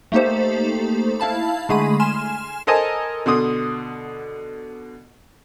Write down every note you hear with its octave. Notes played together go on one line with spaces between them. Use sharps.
A3 A#3 D#4 G4 A4 C5
E4 F5 A5 B5
D3 G#3 A3 G#4 B5 D#7
G#5 C6 F6 E7
A4 A#4 C5 D#5 G#5 A5
B2 D3 C6 D#6